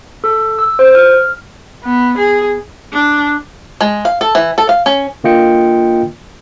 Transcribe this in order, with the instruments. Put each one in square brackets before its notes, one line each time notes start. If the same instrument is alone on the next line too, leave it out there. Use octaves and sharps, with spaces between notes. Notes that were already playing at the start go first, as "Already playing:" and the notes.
[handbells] A4
E6
C5
F6
[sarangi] B3
G#4
[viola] D4
[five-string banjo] G#3
F5
A4
E3
A4
F5
C#4
[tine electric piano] D3 A#3 F4 D#5 G5 C#7